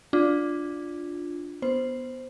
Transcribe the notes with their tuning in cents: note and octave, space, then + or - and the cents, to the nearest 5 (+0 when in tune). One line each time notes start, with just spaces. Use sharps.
D4 +0 F4 +10
B3 +0 C5 +0